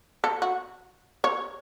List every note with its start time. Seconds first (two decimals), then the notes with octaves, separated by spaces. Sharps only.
0.24 A4
0.42 F#4
1.24 C#5